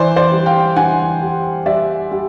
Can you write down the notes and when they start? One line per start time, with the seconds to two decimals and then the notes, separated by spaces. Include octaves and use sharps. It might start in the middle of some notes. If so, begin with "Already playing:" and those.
Already playing: E3 C5 D5
0.16 C5 D5
0.32 G3
0.46 F5 G5
0.76 E3 F#5 G#5
1.22 G3
1.66 G3 D5 E5
2.11 G3